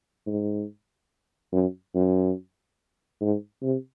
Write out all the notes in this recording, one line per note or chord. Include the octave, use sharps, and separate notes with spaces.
G#2
F#2
F#2
G#2
C3